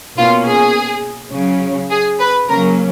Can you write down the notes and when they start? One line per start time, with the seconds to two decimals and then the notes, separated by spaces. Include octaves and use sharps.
0.18 B2 A#3 C#4 F4
0.46 G#4
1.32 C#3 F#3 C#4
1.91 G#4
2.19 B4
2.48 C#3 F#3 A#3 C#4 A#4